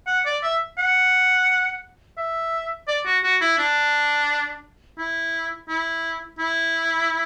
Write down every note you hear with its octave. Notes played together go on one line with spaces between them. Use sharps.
F#5
D5
E5
F#5
E5
D5
F#4
F#4
E4
D4
E4
E4
E4